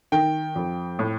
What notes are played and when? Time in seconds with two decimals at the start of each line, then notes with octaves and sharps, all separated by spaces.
0.12 D#3 G5
0.56 F2
0.99 A2